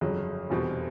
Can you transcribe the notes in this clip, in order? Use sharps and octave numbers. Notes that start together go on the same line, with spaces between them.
G1 F2 C#3 F#3
F1 E2 B2 G3 C4